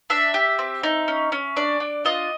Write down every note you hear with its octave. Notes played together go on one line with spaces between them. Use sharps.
D4 E5
G4
C4
D#4
C#4
C#4
D4 D5
D4
F4 D#5